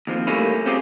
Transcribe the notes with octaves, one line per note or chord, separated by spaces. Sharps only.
D#2 F3 C4
G3 A3 A#3 C#4 E4
C4 C#4 F4 G4 G#4